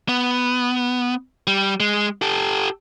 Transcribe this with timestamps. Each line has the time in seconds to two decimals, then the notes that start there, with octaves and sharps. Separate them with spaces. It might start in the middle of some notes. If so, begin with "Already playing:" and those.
0.09 B3
1.47 G3
1.80 G#3
2.22 G4 A4